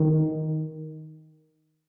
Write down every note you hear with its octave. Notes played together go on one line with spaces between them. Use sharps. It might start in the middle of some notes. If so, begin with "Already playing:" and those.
Already playing: D#3